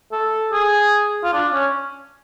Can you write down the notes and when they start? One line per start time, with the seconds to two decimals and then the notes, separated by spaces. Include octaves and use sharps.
0.12 A4
0.53 G#4
1.24 F4
1.33 D4
1.52 C#4